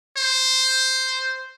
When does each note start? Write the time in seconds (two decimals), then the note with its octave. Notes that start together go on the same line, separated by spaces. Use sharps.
0.18 C5